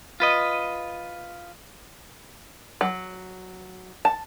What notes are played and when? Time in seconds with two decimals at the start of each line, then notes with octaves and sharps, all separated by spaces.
0.20 F4 B4 D#5
2.81 F#3
4.05 A5